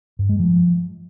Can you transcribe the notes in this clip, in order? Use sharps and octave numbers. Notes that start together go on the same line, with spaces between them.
G2
G#3
F3